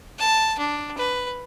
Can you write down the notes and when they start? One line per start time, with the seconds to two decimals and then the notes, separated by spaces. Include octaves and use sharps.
0.19 A5
0.59 D4
0.98 B4